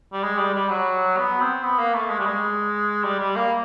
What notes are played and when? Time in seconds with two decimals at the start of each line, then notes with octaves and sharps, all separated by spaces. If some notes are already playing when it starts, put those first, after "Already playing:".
0.13 G3
0.24 G#3
0.38 G3
0.54 G3
0.69 F#3
1.17 B3
1.41 C4
1.63 B3
1.79 A#3
1.94 A3
2.10 G#3
2.19 G3
2.26 G#3
3.04 G3
3.19 G3
3.36 A#3